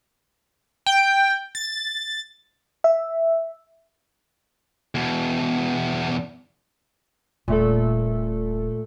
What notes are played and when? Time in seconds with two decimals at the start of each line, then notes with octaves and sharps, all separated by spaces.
0.86 G5
1.55 A6
2.84 E5
4.95 E2 B2
7.48 D#1 A#2 A3 A4